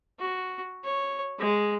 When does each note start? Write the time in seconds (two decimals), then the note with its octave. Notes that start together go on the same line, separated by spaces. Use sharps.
0.20 F#4
0.84 C#5
1.39 G#3